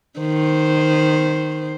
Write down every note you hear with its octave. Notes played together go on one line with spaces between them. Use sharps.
D#3 C5